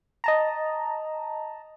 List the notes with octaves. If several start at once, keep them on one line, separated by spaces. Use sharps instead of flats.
D#5 A5 A#5